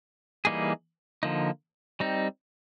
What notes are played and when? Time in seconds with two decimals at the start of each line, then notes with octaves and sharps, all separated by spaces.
0.45 E3 G3 A#3 D#4 G#4
1.23 D3 F3 A#3 D#4
2.00 G3 C4 D#4